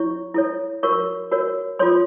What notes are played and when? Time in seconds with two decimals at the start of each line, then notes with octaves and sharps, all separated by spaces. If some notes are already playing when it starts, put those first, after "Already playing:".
Already playing: E4 C#5 C#6
0.34 E4 A4 C#5
0.83 F#4 A#4 C#5 C#6
1.31 F#4 A#4 C#5
1.79 F4 A4 C#5 C6